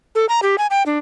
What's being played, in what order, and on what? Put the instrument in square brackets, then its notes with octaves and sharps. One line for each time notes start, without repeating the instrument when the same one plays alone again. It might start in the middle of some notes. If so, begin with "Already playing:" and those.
[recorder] A4
A#5
G4
G#5
G5
D4